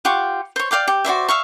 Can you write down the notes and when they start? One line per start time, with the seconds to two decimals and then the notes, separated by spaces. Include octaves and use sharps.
0.05 F4 G4 F#5 C#6
0.56 C5 C#5
0.71 D5 F5 G5 D6
0.88 G4
1.05 F#4 C5 D5 E5
1.29 E5 F5 C#6